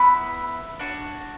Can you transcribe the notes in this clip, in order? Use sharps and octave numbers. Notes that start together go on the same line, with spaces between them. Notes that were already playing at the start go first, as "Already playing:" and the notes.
Already playing: B3 E4 B4 E5
D4 F#4 C#5